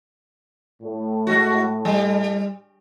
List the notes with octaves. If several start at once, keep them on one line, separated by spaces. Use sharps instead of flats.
A2
G#3 F#4
G3